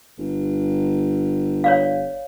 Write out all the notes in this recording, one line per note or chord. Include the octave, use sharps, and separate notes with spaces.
G1
C#5 D5 F5